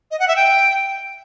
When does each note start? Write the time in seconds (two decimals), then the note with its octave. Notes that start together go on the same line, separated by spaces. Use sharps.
0.11 D#5
0.20 F#5
0.28 E5
0.36 G5